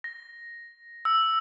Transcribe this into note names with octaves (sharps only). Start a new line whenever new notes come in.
A#6
E6